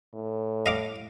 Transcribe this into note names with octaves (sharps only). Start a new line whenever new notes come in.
A2
D#5 F5 D6